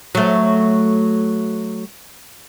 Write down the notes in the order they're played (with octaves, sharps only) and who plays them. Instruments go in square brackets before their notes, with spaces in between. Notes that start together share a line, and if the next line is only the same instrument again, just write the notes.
[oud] F#3 A3